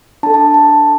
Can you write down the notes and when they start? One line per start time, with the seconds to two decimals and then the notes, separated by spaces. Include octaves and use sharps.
0.23 D4 A5
0.26 A4
0.34 A5
0.54 A5